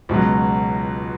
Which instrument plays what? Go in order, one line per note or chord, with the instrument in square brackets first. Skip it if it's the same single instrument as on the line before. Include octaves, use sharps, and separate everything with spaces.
[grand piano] C#2 B2 F#3